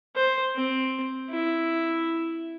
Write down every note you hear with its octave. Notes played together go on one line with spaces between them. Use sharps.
C5
C4
E4